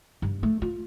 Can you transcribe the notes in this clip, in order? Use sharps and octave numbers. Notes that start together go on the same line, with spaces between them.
G2
A3
F4